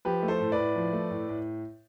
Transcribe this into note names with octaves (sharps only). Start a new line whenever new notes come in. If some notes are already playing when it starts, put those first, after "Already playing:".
F3 G4 B4
A3
A4 C5
A2
B4 D5
A2
F3
A3
A2
A2